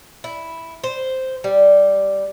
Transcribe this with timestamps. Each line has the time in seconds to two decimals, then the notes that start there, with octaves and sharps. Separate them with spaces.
0.24 E4
0.84 C5
1.44 G3